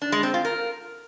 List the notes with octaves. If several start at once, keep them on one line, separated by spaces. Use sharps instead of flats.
D4
G#3
C4
F4
A#4